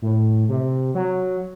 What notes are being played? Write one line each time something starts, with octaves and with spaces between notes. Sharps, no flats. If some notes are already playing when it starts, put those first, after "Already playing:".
A2
C3
F#3